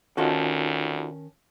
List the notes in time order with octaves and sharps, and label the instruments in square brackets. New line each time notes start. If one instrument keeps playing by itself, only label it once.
[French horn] D2 [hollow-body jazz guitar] D#3 C#4 A4 [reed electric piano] D#4 F4 F#4